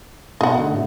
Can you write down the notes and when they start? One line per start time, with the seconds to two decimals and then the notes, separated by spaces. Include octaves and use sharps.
0.41 B2 D#5 F#5
0.57 D3 A3
0.72 A2 C3